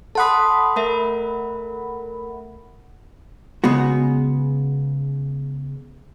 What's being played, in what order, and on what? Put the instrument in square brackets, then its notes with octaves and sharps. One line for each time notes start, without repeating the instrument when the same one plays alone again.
[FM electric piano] A4 F#5 B5 [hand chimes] A5 C6 D#6
[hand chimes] A3 A#4 E5
[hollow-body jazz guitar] C#3 G#3 B3 F#4